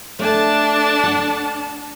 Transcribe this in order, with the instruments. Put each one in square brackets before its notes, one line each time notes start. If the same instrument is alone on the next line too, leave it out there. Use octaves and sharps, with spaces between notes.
[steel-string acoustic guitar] A3 [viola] D4 A5
[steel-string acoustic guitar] F#5